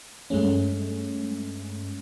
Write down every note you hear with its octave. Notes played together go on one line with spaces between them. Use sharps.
G2 G#3 A3 C#4